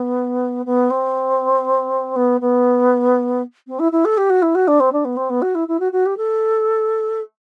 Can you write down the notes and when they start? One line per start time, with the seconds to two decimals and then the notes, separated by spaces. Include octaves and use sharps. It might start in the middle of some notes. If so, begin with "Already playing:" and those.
Already playing: B3
0.66 B3
0.90 C4
2.16 B3
2.41 B3
3.67 C4
3.79 E4
3.92 E4
4.05 A4
4.17 G4
4.30 F#4
4.42 E4
4.55 F#4
4.68 D4
4.80 C4
4.92 D4
5.05 B3
5.17 C4
5.30 B3
5.42 F#4
5.55 E4
5.68 E4
5.80 F#4
5.92 F#4
6.06 G4
6.17 A4